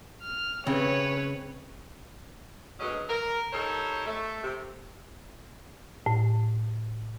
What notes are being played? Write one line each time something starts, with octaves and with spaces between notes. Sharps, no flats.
F6
C#3 C4 B4 C#5
D2 B2 F#3 G#3 C#4 D#5
A#4
G3 D#4 A4 A#4 C5 C#5
A3
C3
A2